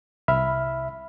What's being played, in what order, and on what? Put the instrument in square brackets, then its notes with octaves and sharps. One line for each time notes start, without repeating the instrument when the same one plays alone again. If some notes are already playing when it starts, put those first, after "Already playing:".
[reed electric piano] C2 E5 B5 F6